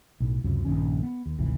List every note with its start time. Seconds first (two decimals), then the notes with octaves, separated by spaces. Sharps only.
0.20 B1 A2
0.44 C#2 F#2 C3
0.65 A#1 G2 D#3 C#4
1.03 B3
1.26 D#2
1.39 G#1 D2 C3 E3